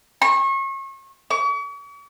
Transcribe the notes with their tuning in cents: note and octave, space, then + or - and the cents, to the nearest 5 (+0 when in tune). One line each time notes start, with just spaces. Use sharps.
C#6 -35
C#6 +45